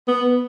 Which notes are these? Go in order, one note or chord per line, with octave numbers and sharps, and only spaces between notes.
B3